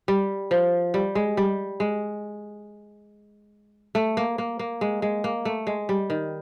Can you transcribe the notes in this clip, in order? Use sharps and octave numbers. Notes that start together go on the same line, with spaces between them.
G3
F3
G3
G#3
G3
G#3
A3
A#3
A#3
A#3
G#3
G#3
A#3
A3
G#3
G3
D#3